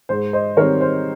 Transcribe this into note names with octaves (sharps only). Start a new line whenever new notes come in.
G#2 C5
C5 D#5
D#3 G3 C4 A#4 C#5
C5